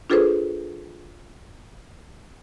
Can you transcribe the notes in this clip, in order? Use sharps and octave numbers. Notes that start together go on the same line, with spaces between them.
D4 F4 G#4 A4 B4 C5